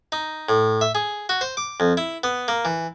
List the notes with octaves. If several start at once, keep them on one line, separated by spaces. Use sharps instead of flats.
D#4
A2
E5
G#4
F#4
C5
D6
F2
E4
B3
A#3
E3